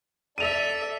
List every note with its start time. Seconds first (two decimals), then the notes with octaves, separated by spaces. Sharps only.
0.38 A4 D5 E5 D#7 F7